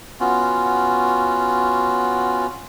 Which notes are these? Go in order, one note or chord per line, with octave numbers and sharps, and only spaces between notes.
B3 C#4 F4 F#4